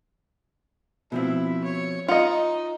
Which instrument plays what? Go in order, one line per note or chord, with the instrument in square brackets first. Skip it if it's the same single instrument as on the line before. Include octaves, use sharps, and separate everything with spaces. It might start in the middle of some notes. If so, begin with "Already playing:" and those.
[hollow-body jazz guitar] B2 F3 C4 [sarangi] E4
[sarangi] C#5
[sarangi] D#4 [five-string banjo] F4 D#5 [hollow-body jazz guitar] F#5